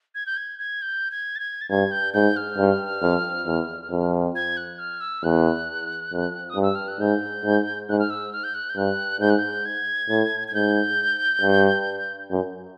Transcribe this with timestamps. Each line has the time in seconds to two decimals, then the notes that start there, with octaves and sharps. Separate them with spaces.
0.15 G#6
0.26 G6
0.37 G#6
0.59 G#6
0.82 G6
1.11 G#6
1.36 A6
1.40 G#6
1.61 A6
1.70 G2 G#6
1.91 G6
2.14 G#2 G6
2.36 F6
2.57 G2
3.02 F2
3.46 E2
3.91 F2
4.35 G#6
4.57 F#6
4.79 F6
5.01 E6
5.24 E2 F#6
6.12 F2
6.50 D#6
6.55 G2
6.62 E6
6.75 F6
6.88 F#6
7.00 G#2 G6
7.44 G#2
7.89 G#2 F#6
7.99 F6
8.10 E6
8.33 F6
8.44 G6
8.54 F#6
8.69 G6
8.76 G2 F#6
9.21 G#2 G6
9.30 F#6
9.39 G6
9.65 G#6
10.09 A2
10.48 G#6
10.54 G#2 G6
11.42 G2
12.31 F#2